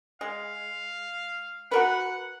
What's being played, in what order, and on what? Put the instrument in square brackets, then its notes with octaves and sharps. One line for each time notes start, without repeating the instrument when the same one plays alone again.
[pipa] G#3 [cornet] F5
[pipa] F#4 A#4 B4 [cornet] F#5